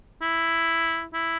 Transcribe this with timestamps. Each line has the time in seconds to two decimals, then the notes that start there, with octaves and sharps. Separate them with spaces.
0.22 E4
1.14 E4